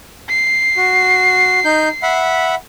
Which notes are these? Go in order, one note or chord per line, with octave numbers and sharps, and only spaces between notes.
C7
F#4
D#4 G6
E5 F#5 B5